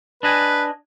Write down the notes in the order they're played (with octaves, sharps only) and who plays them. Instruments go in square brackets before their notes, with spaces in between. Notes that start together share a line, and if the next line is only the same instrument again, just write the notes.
[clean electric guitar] D4 D#5 G#5 [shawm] B4